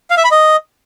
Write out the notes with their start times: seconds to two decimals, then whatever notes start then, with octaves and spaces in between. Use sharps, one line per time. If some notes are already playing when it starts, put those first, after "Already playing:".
0.10 F5
0.17 E5
0.24 B5
0.31 D#5